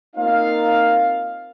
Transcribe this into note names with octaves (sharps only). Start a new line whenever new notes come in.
A#3 C4 D#4 F4 F5